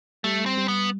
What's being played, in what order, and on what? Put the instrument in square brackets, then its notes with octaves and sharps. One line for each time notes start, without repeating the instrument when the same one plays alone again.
[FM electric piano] G3 [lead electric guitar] A3
[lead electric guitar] C4
[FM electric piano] G3
[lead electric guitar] B3